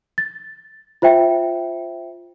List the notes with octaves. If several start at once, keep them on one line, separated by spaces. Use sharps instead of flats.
A6
F4 C5 E5 G5